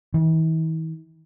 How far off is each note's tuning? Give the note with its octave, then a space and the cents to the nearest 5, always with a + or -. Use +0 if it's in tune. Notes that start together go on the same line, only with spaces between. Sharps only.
E3 -45